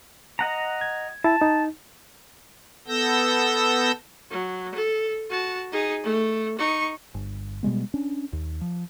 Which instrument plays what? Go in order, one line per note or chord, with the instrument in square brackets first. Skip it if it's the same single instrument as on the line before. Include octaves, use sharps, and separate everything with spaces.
[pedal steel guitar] D#5 F#5 A#5
[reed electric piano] G#6
[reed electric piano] E4 [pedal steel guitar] A5
[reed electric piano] D#4
[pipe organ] B3 A4 E6 G6 A#6
[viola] F#3
A4
F#4 A5
D#4 G#4
A3
D#4 C#6
[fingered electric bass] G1
B2 G3 G#3 B3
C#4 D4
D#2
F3